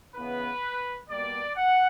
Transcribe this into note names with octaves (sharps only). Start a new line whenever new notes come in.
C#3 E3 B3 B4
B2 G3 A#3 D5
F#5